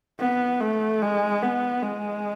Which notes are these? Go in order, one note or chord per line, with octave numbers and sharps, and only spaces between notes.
B3
A3
G#3
B3
G#3